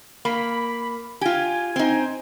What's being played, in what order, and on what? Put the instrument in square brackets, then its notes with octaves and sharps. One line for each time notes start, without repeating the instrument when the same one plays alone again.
[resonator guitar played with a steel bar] A#3 [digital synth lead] B5
[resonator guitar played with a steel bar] F4 G4 [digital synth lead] G#5
[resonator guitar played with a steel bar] C4 D#4